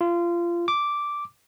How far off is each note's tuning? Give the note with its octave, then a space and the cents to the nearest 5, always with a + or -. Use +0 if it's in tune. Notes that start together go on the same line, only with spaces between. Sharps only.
F4 -25
D6 -5